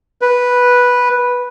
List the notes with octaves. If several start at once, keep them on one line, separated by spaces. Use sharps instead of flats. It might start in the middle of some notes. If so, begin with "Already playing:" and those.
B4